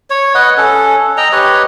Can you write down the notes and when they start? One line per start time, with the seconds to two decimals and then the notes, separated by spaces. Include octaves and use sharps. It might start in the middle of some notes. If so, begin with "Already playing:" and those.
0.10 C#5
0.35 B4 D#5 F#5
0.57 C#4 A4
1.17 D#5 G5 A#5
1.32 G4 B4 C#5 D#5